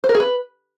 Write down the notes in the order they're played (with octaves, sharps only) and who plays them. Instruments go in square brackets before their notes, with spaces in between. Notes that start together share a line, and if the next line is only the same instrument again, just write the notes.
[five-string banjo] C5
A#4
G#4
B4